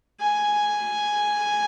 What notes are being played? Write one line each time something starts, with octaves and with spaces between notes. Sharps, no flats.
G#5